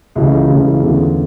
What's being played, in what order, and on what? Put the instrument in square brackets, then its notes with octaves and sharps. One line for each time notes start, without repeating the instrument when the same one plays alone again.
[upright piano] C#2 C#3 E3 A3
C#2 C#3 E3 A3
E2 D3 A3 C#4